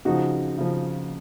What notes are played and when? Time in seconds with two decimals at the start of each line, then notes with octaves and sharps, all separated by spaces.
0.05 C#3 F3 D#4 F#4
0.58 C#3 F3